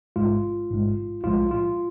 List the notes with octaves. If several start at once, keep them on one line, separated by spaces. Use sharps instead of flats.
A1 G#2 G#3 F4
A1 G#2 G#3
B1 A2 F3 G#3 F4
F4